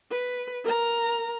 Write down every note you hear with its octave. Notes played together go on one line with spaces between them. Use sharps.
B4
A#4 A#5